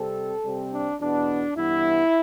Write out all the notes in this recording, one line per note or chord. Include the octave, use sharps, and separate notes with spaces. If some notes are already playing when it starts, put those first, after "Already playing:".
Already playing: C3 G3 C4 A4
C3 G3 C4
D4
E2 B2 B3 D4
G2 E3 B3 E4